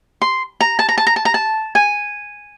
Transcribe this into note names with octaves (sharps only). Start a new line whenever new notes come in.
C6
A#5
A5
A#5
A5
A#5
A5
A#5
A5
G#5